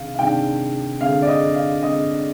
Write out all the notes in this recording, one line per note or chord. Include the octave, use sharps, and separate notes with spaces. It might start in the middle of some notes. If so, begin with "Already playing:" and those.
Already playing: C3 D#3 G#3 D4 F5
F5
C3 D#3 G#3 D4 G5
D3 G#3 C4 F5
D5
D#5
F5
D3 G#3 C4 D#5